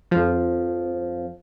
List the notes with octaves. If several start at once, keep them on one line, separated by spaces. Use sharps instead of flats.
F2 F3